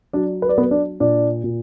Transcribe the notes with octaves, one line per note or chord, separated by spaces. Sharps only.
F#3 D4 D5
B4
D5
F#3 B3 B4
D4 D5
A#2 D4 D5
A#2